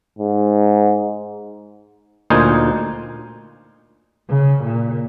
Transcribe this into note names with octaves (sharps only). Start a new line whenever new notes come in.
G#2
D2 A#2 D#4 C5 G#5
C#3
A#2